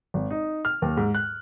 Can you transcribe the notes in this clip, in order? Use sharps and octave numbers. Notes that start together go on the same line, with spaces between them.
G#1
D#4
F6
D#2
G#2
F#6